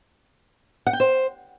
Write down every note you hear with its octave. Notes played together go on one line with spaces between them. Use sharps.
F#5
G5
C5